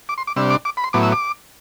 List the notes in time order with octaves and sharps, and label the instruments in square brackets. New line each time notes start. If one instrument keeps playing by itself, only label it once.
[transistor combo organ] D6
C6
D6
C3 G3 D4 E6
D6
D6
B5
C6
A2 F#3 B3 E4 D6
E6
D6